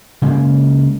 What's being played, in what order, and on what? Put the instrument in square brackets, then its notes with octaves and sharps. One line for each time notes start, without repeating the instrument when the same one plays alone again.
[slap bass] C#3 G#3 A#3